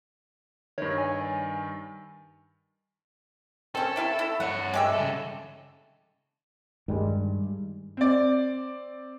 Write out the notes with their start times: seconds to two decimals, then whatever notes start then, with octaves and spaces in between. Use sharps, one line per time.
0.78 G2 D#3 C#5
0.98 G#5
3.75 C4 C#4 A4
3.96 C3 E4 F5
4.19 E4
4.40 G2 C#5 F#5
4.74 G2 G#3 G4 E5
4.93 C#3 A4
6.88 G2 D#3 G3 G#3
7.97 C4 D5